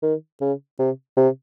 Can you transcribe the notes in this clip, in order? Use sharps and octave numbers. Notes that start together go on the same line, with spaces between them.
D#3
C#3
C3
C3